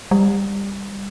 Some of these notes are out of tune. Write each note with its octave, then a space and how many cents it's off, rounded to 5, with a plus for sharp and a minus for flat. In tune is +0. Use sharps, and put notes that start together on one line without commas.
G3 +20